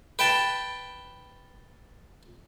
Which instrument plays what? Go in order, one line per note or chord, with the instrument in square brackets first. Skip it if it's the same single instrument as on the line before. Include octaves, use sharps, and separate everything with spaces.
[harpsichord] B4 G5 A5